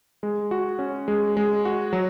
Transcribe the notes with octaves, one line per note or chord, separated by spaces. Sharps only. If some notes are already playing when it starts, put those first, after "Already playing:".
G#3
F#4
C#4
G#3
G#3
F#4
F#3